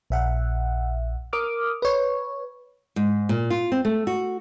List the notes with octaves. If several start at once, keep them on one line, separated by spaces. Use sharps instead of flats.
A#1 E5 F#5
A#4 D6 D#6 F6
B4 C#5
G#2
A#2
F4
C4
A3
F#4